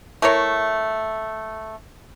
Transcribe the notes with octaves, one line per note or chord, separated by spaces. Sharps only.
A3 E4 A#4 C#5